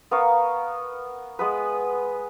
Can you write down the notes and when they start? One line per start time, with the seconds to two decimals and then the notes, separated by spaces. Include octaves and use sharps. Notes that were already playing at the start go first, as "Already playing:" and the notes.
0.11 B3 A#4 F5 C#6
1.39 G#3 B3 B4